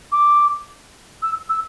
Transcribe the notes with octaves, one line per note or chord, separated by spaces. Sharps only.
D6
E6
E6